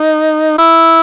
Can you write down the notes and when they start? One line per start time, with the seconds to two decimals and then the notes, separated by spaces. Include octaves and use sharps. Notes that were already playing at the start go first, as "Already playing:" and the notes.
Already playing: D#4
0.58 E4